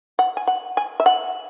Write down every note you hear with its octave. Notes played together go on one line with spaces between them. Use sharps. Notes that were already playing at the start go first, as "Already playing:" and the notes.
F#5
G#5
F#5
G#5
E5
F#5